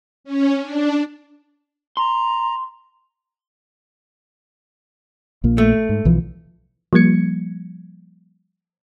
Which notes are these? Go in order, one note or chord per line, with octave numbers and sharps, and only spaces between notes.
C#4
D4
A#5 C6
A#1 A#2 A#3
A3
G#2
B1 E3 F3
F3 G3 A#3 G#6 C#7